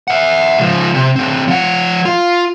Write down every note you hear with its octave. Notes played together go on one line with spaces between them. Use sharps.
E5 F#5
C#2 F3
C3
D3 C4
F3 F#5
F4